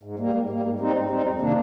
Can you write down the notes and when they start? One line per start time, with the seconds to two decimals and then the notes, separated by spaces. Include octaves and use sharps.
0.03 G#2
0.19 G3 A#3
0.34 G#2
0.49 G3 A#3
0.64 G#2
0.80 G3 C4 D#4
0.95 G#2
1.10 G3 C4 D#4
1.25 F2
1.40 C3 D#3 A#3 D4